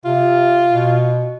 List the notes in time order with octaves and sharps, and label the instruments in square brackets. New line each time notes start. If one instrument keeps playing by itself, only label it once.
[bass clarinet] C3 [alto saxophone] F4
[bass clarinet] B2